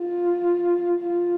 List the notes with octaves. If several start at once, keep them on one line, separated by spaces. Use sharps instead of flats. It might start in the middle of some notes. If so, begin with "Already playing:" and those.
Already playing: F4
F4